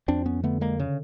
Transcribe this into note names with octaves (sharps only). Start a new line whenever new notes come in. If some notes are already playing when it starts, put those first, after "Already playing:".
F2 C4 D4
B3 C#4
D3 A3 B3
G#3 A#3
C#3